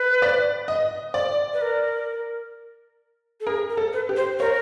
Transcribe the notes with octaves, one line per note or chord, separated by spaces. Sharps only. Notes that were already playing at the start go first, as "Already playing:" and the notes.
Already playing: B4
D5
D#5
D5
B4
A#4
A4
G#4 A#4
A#4
A4
B4
G4
C5
A#4 C#5